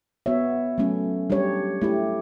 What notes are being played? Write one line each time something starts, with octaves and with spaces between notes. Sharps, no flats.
B3 F#4 C#5 E5
F#3 A3 C#4
G3 D4 G4 C#5
A3 E4 G4